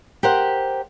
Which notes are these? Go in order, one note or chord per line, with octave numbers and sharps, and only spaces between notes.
G4 A#4 C5 F#5